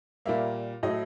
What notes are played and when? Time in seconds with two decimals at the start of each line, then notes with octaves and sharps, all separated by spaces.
0.26 A#2 G3 A#3 E5
0.83 A2 F#3 A3 D#5